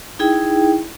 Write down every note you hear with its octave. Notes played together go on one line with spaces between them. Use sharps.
D#4 E4 G#4 G5